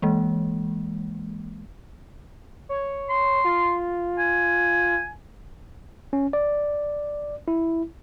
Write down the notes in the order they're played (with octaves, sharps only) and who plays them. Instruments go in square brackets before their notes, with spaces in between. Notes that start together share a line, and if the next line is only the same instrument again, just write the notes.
[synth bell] E3 G#3 A#3
[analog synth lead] C#5
[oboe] C6
[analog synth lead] F4
[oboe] G#5
[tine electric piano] C#4
D5
E4